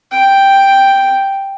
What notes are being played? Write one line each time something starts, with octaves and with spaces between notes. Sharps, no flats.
G5